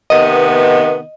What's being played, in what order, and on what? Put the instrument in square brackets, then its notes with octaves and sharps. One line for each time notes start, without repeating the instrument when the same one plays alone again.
[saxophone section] C3 D#3 B3 [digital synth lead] D#5